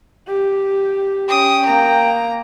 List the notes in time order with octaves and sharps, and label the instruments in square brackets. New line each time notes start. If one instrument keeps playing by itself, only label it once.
[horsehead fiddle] G4
[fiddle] C#4 D#6 [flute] G5
[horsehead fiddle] A#3 [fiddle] A#5